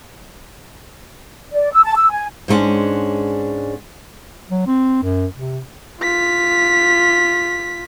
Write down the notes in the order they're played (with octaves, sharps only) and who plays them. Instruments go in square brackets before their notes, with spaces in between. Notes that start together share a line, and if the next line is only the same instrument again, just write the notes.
[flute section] D5
E6
A5
E6
G#5
[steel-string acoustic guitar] G#2 G#3 A3 C#4 D4
[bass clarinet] F#3
C4
F#2
C3
[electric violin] F4 B6